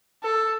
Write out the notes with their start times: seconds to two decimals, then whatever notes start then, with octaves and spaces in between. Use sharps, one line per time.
0.24 A4